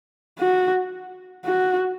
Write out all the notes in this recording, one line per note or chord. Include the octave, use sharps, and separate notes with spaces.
F#4
F#4